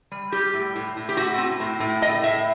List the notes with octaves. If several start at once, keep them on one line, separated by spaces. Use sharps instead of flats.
G3
G3 G4
A2
A2
A2
G4
A2 F#4
C4
A2
A2
A2 D#5
A2 E5